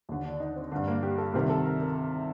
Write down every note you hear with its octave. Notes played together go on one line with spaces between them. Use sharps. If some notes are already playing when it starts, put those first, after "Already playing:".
D#2 D3
D4
D#4
C4
G2 D3 D4
A#3
G4
A4
C2 C3 D#3 A#4
A4
A#4
A#4